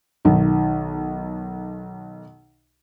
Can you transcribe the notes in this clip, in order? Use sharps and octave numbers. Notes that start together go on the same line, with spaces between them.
B1 D#3